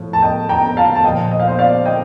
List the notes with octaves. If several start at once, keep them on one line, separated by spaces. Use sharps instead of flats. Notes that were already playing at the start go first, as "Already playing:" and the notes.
Already playing: A2 F3
A5
D#5 G5
G5 A#5
A#5
F5 A5
A5
A#2 F3 D#5 G5
D#5
F5
C5 D#5
D5 F5
D#5 G5